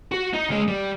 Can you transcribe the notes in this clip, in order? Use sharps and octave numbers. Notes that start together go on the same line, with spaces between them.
F#4
D#4
C#2 G#3
G3